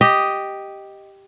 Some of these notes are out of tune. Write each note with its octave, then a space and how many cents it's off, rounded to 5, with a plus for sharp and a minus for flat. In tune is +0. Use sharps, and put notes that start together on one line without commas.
G4 +0 D#5 +0